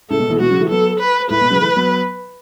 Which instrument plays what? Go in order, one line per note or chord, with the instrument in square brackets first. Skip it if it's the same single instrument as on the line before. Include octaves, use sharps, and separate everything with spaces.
[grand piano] A2 C#3 [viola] A4
[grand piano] B2
B2 E3
[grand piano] B2 E3 [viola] F#4
[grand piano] C#3 F#3
E3 A3
[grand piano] F#3 B3 [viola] A4
[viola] B4
[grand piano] A2 [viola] B4
[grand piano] B2
C#3 F#3
E3 A3
F#3 B3